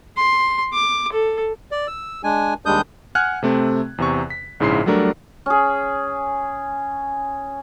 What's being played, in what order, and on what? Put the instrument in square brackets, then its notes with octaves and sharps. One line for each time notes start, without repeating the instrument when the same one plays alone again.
[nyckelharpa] C6
D6
A4
[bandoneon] D5
E6
G#3 D4 G#5
D#2 G3 G#3 D4 D#6 G6
[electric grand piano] F#5 G#5 F6 F#6 G#6
C3 A3 C4
E2 C3 C#6
B6
A#1 G#2 C#3 E4 C6 C7
F#3 G3 A3 D4 A#4
[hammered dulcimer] C#4 G#4